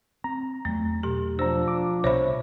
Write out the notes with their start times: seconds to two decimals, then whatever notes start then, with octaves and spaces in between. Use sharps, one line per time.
0.24 C4 A#5
0.65 E2 F#3 A3
1.03 B2 G4
1.39 F3 D4 C5 A#5 E6
1.68 D6
2.04 C2 B2 C5 C#5 E5 B5